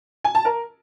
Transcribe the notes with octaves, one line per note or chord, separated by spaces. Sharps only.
G#5
A5
A#4